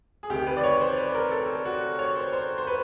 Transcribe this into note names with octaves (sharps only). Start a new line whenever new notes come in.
G#4
D2 C3 D#3 G4
B4
D5
C#5
C5
B4
A#4
A4
F#4
C#5
C5
C5
C5
B4